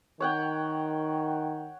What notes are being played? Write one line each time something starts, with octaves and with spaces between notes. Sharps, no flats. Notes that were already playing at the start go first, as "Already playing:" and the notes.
D#3 C#5 F#5 G5